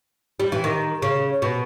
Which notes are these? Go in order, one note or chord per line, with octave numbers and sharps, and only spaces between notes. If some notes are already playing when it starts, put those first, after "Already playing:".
G3
E3
D#3
C#3
B2